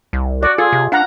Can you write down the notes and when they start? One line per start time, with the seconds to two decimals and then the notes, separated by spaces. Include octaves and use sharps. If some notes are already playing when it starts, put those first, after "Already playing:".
0.13 C2
0.43 F#4 D5
0.58 F4 G#4 A4
0.73 C3
0.92 D4 F5 F#5 A#5